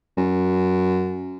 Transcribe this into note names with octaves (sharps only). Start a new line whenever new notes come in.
F#2